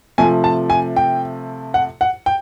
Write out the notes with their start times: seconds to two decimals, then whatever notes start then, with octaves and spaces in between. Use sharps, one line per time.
0.18 C3 F3 A3 G#5
0.44 A5
0.70 G#5
0.96 G5
1.74 F#5
2.01 F#5
2.26 G5